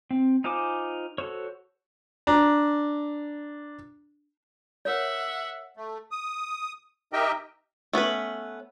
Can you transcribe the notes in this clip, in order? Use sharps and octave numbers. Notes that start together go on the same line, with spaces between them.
C4
D#4 F4 C5 G#5 D6
F#4 A4 C5 C#5
D4 A#5
A#4 C#5 E5 F#5
A3
D#6
D#4 G4 A#4 D#5 E5 G5
A3 B3 C#4 B4